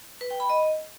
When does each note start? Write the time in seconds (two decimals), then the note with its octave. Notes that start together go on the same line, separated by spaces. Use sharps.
0.21 B4
0.30 G5
0.40 B5
0.50 D#5